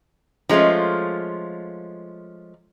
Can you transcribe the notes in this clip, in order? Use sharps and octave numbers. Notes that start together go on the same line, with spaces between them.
F3 G#3 A3 C#4 F4